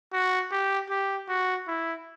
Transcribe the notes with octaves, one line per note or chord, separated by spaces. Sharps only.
F#4
G4
G4
F#4
E4